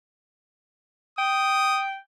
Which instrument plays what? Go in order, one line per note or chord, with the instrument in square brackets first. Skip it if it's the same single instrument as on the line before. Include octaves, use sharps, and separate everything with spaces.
[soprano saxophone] G5 [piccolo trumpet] D#6